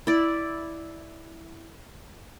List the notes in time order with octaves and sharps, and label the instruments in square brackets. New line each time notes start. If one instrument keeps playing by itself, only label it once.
[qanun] E4 D5